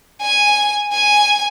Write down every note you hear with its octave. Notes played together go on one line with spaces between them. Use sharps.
G#5
G#5